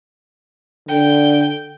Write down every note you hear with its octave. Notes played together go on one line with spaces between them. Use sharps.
D3 G5